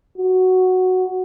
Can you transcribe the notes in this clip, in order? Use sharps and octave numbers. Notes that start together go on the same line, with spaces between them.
F#4